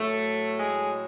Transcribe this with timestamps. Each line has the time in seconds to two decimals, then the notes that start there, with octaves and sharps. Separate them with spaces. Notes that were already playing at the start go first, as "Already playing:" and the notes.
Already playing: A2 F#3 A3
0.58 G#3